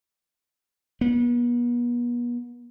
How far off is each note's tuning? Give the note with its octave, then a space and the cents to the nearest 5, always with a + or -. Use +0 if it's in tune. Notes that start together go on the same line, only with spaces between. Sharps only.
B3 -40